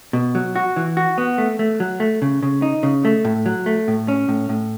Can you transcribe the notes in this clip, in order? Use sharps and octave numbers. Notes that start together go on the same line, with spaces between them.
B2
F#3
F#4
E3
F#4
B3
A3
A3
F#3
A3
C#3
C#3
D#4
C#3
A3
A2
F#3
A3
A2
C#4
A2
A2